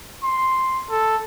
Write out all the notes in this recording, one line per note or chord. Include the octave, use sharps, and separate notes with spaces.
C6
A4